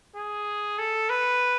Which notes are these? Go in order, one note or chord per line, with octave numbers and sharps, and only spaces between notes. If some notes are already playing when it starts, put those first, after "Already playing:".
G#4
A4
B4